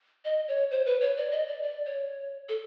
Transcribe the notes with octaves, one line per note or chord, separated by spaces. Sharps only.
D#5
C#5
C5
B4
C#5
D5
D#5
D5
D5
C#5
A4